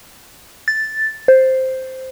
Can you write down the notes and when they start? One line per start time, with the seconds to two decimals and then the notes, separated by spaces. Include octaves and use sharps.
0.68 A6
1.28 C5